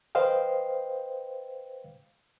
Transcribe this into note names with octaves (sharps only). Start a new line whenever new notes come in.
B4 C5 D#5 F5 G5